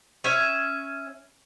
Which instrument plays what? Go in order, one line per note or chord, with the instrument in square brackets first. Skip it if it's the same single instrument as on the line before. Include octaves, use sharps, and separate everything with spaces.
[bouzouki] C#4 E5